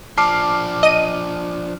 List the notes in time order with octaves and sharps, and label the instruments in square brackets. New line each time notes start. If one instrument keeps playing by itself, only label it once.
[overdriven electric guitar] F3 D4 [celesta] A5 [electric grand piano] D6 F6 C7
[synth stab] D#5 D#7